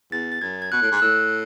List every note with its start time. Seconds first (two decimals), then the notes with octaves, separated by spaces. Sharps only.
0.12 E2 A6
0.32 A6
0.41 F#2 G#6
0.62 G#6
0.72 B2 F#6
0.81 A2
0.91 G#2
0.97 F#6
1.02 A2 E6